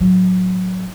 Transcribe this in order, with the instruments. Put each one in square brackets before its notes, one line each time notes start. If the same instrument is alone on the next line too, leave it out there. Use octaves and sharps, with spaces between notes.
[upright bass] A2 F#3